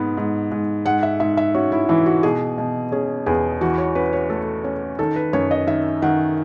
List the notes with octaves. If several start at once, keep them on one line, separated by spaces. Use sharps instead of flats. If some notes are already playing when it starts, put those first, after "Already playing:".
Already playing: G#2 B3
G#2
G#2
G#2 F#5
E5
G#2 E5
E5
C#4 F#4
E4
E3 E4
F#4
B2 G#4
B2
C#4 G#4
E2 G#4
E3 F#4
C#5
C#4 B4
C#5
A3 A4
C#4
D#3 A4
B4
F#2 C#5
D#5
D#3 E5
D#3 F#5